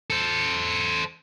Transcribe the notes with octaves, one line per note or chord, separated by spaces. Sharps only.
A4 C5